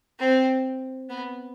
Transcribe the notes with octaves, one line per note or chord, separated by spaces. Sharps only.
C4
B3